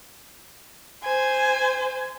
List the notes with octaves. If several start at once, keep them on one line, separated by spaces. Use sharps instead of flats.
C5 G#5